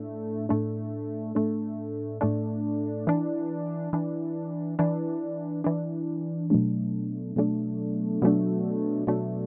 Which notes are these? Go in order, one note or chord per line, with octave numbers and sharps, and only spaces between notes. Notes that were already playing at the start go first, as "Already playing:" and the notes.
Already playing: A2 A3 D4
A2 A3 D4
A2 A3 D4
A2 A3 D4
E3 D4
E3 D4
E3 D4
E3 D4
B2 F#3 A3 D4
B2 F#3 A3 D4
B2 F#3 A3 D4
B2 F#3 A3 D4